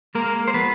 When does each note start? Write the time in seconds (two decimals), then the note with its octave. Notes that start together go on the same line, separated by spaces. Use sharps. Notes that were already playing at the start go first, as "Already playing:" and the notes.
0.15 G#3 A#3 A#4
0.48 C5
0.54 F3 B3 B4